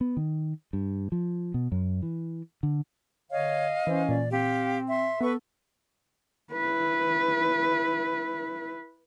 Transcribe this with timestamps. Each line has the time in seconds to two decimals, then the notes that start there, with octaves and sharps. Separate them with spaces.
0.01 B3
0.17 D#3
0.73 G2
1.12 F3
1.54 B2
1.72 F#2
2.03 E3
2.63 D3
3.31 D3 C#5 D#5 F5
3.87 E3 C#4 C5
4.09 A#2 D5
4.32 C4 G4 F5
4.88 E5 C6
5.21 B3 A4 B4 C#6
6.52 E4 B4